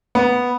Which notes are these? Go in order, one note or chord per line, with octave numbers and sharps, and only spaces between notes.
B3